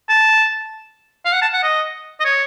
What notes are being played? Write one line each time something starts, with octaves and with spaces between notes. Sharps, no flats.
A5
F5
F#5
A5
F#5
D#5
D#5
C#5